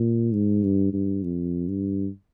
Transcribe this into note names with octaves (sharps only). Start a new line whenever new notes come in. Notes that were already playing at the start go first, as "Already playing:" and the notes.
Already playing: A#2
G#2
G2
G2
F2
G2